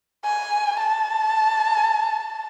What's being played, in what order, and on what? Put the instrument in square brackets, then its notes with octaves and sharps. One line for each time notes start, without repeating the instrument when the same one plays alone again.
[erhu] G#5
A5